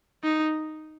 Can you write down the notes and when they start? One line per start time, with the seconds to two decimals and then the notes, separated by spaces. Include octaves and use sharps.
0.23 D#4